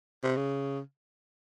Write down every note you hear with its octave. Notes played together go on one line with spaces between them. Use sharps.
C3
C#3